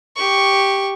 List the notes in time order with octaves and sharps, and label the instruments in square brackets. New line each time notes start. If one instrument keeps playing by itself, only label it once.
[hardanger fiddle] G4 C#6